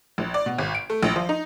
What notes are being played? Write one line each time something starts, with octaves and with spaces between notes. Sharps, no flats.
A#1
D5
B2
G#1
D7
A3
A#1
F3
D#4